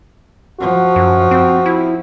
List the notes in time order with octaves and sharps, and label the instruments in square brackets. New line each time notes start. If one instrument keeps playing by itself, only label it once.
[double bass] F3 [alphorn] F#4
[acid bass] F#2
C4
E4